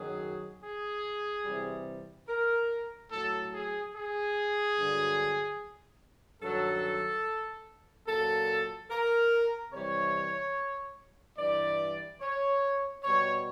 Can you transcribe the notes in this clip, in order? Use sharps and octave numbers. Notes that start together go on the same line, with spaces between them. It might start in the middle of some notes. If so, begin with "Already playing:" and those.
Already playing: F#2 D#3 F#3 G#4
G#4
C3 E3 G3
A#4
A2 F#3 A4
G#4
G#4
G2 D3 F#3
G2 D#3 F#3 A4
A#2 F#3 A4
A#4
C3 E3 G3 C#5
G2 E3 G3 D5
C#5
B2 G3 C#5